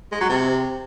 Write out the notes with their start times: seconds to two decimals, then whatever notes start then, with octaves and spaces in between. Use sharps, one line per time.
0.12 G#3
0.20 F#3
0.29 C3